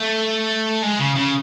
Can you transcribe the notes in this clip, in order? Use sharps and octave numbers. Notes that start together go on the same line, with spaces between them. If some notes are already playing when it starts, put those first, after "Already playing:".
Already playing: A3
G#3
C#3
C#3